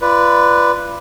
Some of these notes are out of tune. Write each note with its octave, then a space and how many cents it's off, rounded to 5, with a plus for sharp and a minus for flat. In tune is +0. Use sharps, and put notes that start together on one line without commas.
F4 -30 B4 +0 D5 +0